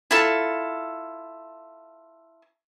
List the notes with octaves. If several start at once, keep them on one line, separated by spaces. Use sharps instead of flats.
E4 F4 A4